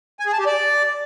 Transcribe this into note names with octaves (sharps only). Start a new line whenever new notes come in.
G#5
G#4
A5
G4
D5